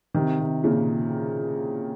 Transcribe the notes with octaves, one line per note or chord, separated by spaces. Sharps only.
C3 D#3
C3
A#2 C#3